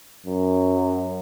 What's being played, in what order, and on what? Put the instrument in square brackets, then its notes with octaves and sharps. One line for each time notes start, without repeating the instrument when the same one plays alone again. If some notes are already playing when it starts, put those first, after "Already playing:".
[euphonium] F#2